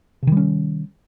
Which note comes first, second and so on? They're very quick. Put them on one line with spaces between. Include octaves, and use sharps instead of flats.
C3 D#3 G3 C#4